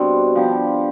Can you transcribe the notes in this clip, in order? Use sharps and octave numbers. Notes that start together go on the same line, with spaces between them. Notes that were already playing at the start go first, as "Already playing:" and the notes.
Already playing: B2 G3 C4 D4
F3 B3 D4 G4